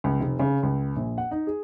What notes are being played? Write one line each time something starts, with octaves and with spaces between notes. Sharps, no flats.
C#2
F1
C#3
C#2
A#1
F#5
D#4
G#4